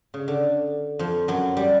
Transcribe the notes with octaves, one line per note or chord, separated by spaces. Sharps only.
C#3
D3
F2 F3
F#2 F#3
G3